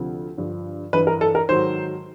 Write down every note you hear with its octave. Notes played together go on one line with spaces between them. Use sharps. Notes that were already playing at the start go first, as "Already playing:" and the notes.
Already playing: D2 C3 F3
G2 D3 F3
G2 E3 B4
A#4
A4
A#4
G#2 D#3 F#3 C5